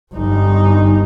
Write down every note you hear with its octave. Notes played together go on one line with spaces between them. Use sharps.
G1 D#4